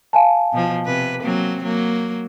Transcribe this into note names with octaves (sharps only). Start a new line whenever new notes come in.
F5 G#5 A5
B2 F3
C3 B4
F#3 A#3 C4
F#3 A#3